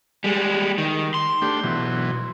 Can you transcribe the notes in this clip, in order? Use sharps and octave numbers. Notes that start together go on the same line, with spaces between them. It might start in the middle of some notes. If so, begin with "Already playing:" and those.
G3 G#3
D#3
C6
A3 D4 G4
B2 E3 F#3